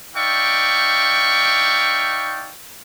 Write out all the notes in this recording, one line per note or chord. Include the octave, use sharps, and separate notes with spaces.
D#4 D5 E5 F5 G5 C#6